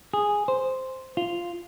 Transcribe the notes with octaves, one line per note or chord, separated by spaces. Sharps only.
G#4
C5
F4